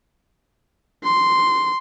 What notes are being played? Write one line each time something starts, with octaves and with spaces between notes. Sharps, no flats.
C6